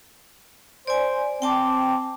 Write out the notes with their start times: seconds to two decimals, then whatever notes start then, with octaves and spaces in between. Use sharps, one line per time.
0.87 C5 D5 G#5
1.42 C4 G5 A5 D6